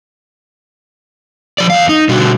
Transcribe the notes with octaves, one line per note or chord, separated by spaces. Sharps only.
F3 D5
E2 F5
D#4
B2 D3 G3 F#4